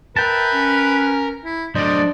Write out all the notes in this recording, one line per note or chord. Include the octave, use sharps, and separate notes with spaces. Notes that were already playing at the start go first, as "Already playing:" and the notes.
A#4 B4 E5 G5 A5
C#4
E4
F#3 A3 D4 C5 D5 D#5